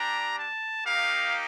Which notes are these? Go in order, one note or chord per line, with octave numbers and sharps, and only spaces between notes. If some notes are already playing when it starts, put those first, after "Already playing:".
Already playing: G3 D4 G4 A#5
A5
A#3 D#4 G4 F5